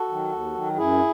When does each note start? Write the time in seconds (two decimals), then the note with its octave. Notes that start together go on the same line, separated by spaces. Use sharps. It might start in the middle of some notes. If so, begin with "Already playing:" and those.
Already playing: F#4 A4
0.09 D#3 F#3
0.32 D#2
0.54 D#3 F#3
0.77 F#2 E4 G#4